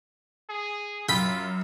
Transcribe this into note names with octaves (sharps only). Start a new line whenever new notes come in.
G#4
F#2 F4 G5 B5